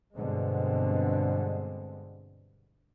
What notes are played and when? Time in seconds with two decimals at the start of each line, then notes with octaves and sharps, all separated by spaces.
0.15 G2 B2 D3 G#3 C4